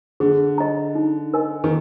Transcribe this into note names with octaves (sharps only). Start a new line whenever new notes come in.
D3 G#4
D#5 A#5
D#4
A#4 D#5 G#5
D#3